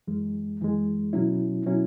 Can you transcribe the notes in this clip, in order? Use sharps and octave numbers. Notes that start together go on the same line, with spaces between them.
F#2 E3 G#3
F#2 E3 G#3
B2 F#3 C#4 E4
B2 F#3 C#4 E4